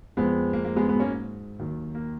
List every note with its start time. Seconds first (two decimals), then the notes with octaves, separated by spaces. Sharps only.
0.17 F2 F3 G#3 B3
0.53 A#3
0.65 A#3
0.76 G#3 B3
0.88 G#2 F#3 G#3 B3
1.00 A#3 C#4
1.59 D#2 D#3 F#3
1.95 A#3